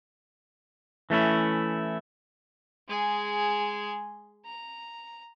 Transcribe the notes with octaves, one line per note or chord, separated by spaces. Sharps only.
E3 A3 C#4 E4
G#3 G#4
A#5